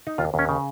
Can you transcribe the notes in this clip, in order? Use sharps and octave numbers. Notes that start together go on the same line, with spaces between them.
D#4
D#2 F4
D#2 C#4
C#3